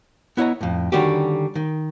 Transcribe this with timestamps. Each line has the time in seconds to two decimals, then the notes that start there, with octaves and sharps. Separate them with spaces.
0.37 B3 E4 C#5 D#5 A#5
0.61 F2 A2
0.92 D3 D#3 G3 C#4 F#4 G4
1.55 D#3